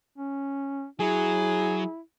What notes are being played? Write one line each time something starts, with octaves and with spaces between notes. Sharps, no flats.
C#4
F#3 E4 G#4